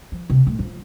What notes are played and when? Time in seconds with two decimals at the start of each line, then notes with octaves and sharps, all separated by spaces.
0.12 F3
0.30 C3
0.47 A2
0.59 F3